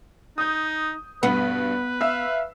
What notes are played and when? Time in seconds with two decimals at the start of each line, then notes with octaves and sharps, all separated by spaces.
0.38 D#4 D#6 G6
1.23 G2 B2 B3 B4
2.01 E5 F5 E6